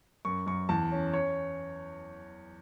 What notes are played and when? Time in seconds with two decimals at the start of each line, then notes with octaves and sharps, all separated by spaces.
0.25 F#2 C#6
0.47 F#2 C#6
0.69 E2 A5
0.92 C#4
1.14 C#5